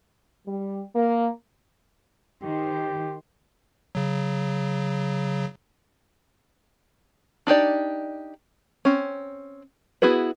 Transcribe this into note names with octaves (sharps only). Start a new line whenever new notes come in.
G3
A#3
D#3 G4 C5
C#3 F#3
D4 D#4 G4 D5
C4 C#4
B3 E4 F#4 G#4 B4